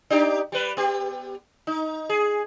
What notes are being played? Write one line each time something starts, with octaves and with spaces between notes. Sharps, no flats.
D4 D#4 G4
G3 B4
B3 G4
D#4
G#4